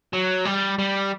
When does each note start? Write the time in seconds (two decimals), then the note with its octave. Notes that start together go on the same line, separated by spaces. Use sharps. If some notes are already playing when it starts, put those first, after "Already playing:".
0.13 F#3
0.45 G3
0.79 G3